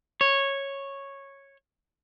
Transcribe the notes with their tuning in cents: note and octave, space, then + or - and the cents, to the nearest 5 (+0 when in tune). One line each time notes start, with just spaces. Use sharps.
C#5 -10